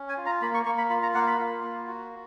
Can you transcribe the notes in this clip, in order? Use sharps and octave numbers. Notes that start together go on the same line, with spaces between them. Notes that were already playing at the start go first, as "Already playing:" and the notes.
Already playing: C#4
G#5
F4
A#5
A#3 B5
C#6
A#3 C#6
B5
F4 B5
A#5
A#3 F#5
B5
F4
A#3
F#4